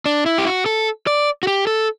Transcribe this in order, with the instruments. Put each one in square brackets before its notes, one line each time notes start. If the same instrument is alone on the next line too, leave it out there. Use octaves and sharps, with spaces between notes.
[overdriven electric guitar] D4
E4
G4
F#4
A4
D5
F#4
G4
A4